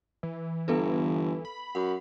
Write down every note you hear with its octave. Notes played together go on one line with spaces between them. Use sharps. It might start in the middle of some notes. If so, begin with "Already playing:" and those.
E3
G1 B3 A4 B4
B5
F#2 F#5